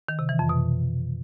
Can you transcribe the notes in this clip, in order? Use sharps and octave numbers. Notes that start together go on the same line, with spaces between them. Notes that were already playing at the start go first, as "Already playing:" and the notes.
D#3
C3
E3
F2
B2